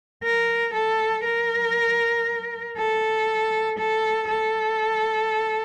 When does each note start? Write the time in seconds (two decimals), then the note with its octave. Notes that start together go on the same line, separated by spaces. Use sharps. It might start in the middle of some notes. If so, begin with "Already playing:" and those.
0.24 A#4
0.74 A4
1.25 A#4
2.77 A4
3.79 A4
4.29 A4